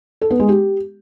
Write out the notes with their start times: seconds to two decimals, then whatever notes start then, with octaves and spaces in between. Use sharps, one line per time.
0.21 A4
0.31 B3
0.40 G#3
0.49 G4